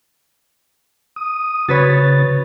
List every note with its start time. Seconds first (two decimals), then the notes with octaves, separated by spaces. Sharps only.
1.16 D#6
1.69 C#3 F#4 B4 C#5 A6